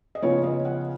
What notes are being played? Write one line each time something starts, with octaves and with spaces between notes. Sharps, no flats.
D#5
C#3 F3 B3 F4 C#5
D#5
F#5